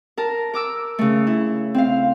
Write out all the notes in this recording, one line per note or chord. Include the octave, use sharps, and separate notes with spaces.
A#4 A5
A#4 D6 E6
C#3 A3
E4
C4 F5